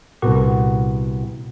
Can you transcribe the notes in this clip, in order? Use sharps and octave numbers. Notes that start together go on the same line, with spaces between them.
C2 A#2 B3 F#4